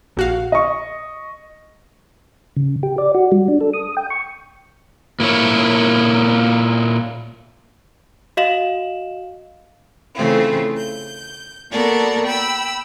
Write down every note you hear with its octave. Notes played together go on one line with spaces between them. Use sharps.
A#1 F#4 F5
D#5 C#6
C#3
G4
D5
F#4
G3
D4
A4
D#6
G5
C#6
A#2 A#3 E4 C#5
F#4 D#5 F5 E7 F#7
C#3 E3 A3 C4 F4
G6
A#3 B3 F#4 A4 A#4 D5
G5 B5 E6